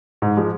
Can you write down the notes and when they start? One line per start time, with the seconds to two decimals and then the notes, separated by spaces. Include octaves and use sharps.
0.22 G#2
0.37 F3 G#3